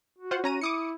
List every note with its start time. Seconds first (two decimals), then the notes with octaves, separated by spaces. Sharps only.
0.18 F#4
0.31 F4 C5 F#5
0.44 C#4 A#5 D#7
0.61 E4 D6 D#6 C#7